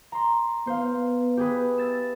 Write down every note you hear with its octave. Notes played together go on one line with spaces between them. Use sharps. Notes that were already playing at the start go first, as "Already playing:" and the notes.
A#5 C6
B3 C5 F5
G4 G#4 B4
E6 A6 E7